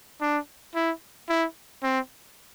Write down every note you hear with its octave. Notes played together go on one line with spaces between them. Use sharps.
D4
E4
E4
C4